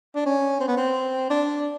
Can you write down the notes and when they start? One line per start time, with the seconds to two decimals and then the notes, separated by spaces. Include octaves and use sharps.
0.15 D4
0.26 C#4
0.60 C4
0.68 B3
0.77 C4
1.30 D4